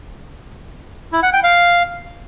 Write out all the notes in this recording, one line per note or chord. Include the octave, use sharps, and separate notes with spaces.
E4
F#5
G5
F5